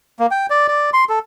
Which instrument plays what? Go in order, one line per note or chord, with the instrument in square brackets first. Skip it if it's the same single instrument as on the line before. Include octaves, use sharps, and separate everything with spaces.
[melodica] A#3
G5
D5
D5
C6
A4